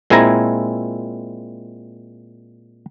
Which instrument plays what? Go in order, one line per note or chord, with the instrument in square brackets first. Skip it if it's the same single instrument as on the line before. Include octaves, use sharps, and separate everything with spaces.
[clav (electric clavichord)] A#2 G#3 C4 E4 G#5 A#5